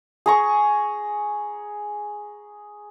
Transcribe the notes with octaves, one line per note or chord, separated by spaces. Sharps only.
G#4 A#5 C#6